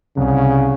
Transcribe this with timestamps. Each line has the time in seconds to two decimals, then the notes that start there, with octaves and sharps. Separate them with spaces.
0.17 C2 C#3